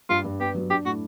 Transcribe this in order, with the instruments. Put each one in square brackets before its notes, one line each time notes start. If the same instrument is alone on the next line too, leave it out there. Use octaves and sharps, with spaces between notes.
[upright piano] G2 [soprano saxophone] F4
[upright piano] G2
[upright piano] B3 [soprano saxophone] G4
[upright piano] F#3
[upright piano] D4 [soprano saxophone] G4
[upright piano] A2 [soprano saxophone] F#4